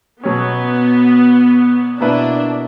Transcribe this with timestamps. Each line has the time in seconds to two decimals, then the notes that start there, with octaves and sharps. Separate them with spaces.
0.23 B2 F#3 B3 C#4
2.00 B2 A#3 D4 E4 B4